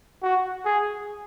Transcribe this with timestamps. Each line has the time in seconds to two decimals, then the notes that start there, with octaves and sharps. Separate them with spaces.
0.22 F#4
0.65 G#4